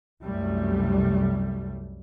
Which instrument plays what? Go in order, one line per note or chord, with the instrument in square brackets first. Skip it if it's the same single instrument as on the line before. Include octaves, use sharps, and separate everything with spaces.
[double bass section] C2 F#2 C3 G3 A3